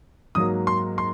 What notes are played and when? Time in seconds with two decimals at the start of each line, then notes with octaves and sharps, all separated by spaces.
0.35 G#2 F#3 A#3 D#6
0.67 C6
0.98 C6